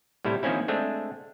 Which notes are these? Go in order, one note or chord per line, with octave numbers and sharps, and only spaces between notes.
A2 C3 G3 E4
D#3 F3 A#3 C4 C#4 E4
G#3 A3 C4 D4